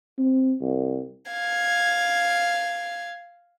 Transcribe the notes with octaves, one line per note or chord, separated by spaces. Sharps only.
C4
C2
F5 G#6